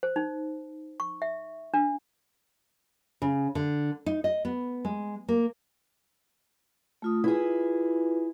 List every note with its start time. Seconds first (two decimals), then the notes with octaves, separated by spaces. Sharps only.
0.03 C5
0.16 D#4
1.00 C#6
1.22 E5
1.74 D4
3.22 C#3
3.55 D3
4.06 D#4
4.24 D#5
4.45 B3
4.85 G#3
5.28 A#3
7.02 A3 F4 D#6
7.24 E4 F4 G#4 B4